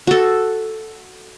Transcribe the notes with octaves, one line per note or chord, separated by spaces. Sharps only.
F#4 A4